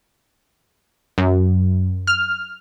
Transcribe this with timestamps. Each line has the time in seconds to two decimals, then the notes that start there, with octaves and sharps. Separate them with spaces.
1.18 F#2
2.07 F6